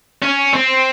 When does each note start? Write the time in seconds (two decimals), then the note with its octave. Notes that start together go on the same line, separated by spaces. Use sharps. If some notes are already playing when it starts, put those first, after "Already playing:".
0.23 C#4
0.54 C4